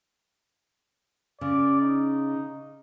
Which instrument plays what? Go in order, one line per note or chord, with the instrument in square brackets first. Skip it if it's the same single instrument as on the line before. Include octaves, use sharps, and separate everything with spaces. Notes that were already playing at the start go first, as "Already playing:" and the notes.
[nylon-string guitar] C#3 [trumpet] D5
[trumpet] D#4